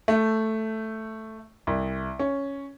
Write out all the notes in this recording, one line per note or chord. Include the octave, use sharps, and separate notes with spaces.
A3
C2
C#4